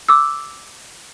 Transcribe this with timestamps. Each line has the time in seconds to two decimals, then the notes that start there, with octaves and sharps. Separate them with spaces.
0.09 D6 E6